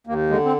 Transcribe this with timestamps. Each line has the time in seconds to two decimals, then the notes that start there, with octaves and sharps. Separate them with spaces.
0.07 D#2 A#3
0.30 D3 G#3
0.45 C4